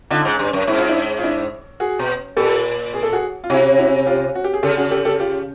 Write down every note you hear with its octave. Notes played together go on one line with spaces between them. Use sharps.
D3 D#4 F4
G#2
G2
F#2
G#2 E4
F4
D4 E4
F4
D4 E4
F#4 G#4
B2
A#2 G4 A4
G#4
A4
F#4 G#4
F4
C3 E4 F#4
E4 F#4
F4 G4
F#4
G4
G#4
C#3 G4 A4
F#4 G#4
G4 A4
G4 A4
F4 G4